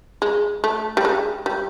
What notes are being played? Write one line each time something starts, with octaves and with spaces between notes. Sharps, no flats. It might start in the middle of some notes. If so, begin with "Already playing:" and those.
G#3
A3
G3
G#3
G3